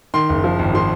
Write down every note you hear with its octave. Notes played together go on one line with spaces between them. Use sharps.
D#3 C6
F#1
F3
G#1
F3 C6